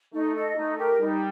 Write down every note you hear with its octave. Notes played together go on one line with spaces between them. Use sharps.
A3 D#4
A4 D#5
A3 D#4
G4 A#4
G3 D#4